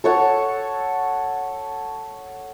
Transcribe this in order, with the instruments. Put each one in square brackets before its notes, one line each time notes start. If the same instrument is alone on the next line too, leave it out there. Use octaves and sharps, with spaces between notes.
[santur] A4 C#5 F#5